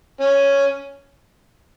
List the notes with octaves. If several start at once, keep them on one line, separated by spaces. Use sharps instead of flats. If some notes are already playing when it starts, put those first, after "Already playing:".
C#4